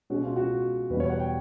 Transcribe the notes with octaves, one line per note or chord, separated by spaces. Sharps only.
B2 G#3 C#4 F#4
F4
F#4
E2 B2 G3 B4
C#5
F#5
G5